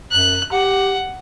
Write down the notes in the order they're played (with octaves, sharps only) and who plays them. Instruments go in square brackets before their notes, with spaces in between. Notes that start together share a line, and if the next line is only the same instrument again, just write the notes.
[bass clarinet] F#2 [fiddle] F#6
[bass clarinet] G4 [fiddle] F#5